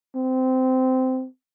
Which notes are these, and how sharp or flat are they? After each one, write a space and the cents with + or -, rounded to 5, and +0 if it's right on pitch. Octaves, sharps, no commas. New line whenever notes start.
C4 -15